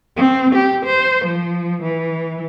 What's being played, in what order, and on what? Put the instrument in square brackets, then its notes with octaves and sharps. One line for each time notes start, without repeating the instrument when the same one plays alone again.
[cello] C4
G4
C5
F3
E3